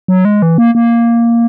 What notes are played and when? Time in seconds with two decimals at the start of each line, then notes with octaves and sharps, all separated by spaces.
0.08 F#3
0.25 G#3
0.42 E3
0.58 A#3
0.75 A#3